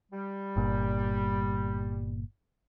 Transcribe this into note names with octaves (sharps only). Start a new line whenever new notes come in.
G3
G1 A#2